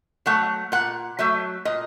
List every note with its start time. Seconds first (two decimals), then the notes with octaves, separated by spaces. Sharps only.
0.26 F#3 A3 F#5
0.72 A#2 F#5
1.19 F#3 A3 E5
1.65 A#2 D#5